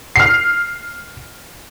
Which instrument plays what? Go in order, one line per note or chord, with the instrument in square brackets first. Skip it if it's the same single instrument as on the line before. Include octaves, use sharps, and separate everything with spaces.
[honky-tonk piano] F6 C7